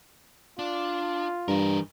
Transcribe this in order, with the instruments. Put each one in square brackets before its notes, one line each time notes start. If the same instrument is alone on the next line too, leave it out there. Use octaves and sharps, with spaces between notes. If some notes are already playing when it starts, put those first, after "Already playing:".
[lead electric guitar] D4 [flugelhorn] F4
[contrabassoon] G2 [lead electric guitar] E3 A#4